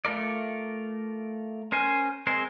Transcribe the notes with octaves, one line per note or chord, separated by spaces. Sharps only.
A3 F4 A#4 D5
C#4 A#4 C5 G#5
G#3 C4 G#4 A#4 C5